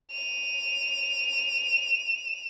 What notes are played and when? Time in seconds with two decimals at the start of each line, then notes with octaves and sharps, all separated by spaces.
0.12 D#7 F7